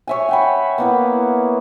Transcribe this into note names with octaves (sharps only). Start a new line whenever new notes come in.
C#5 E5 G#5
F#5 G5 B5
A#3 B3 E4